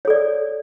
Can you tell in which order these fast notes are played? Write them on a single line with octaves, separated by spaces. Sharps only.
C#5 A4 D5